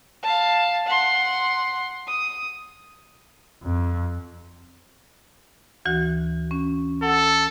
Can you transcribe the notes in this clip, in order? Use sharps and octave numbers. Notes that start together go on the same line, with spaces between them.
F5 A5
F#5 C6
D#6
F2
D2 E3 F#4
C#4
A4 F#5